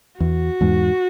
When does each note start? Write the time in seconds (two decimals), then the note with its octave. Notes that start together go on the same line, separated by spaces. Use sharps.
0.20 E2 F#4
0.61 E2 G#2